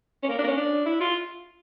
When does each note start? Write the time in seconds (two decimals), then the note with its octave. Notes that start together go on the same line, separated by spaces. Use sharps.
0.23 C#4
0.29 A#3
0.38 D4
0.43 A#3
0.47 C#4
0.57 D4
0.86 E4
1.00 F4